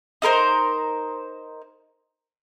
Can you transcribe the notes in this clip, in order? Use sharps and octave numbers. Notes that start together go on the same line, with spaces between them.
D#4 A4 A#4 C5